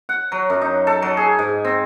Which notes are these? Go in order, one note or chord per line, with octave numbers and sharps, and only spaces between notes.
F#5
F#3
F#2
D#4
A4
F#3
G#4
G#2
C4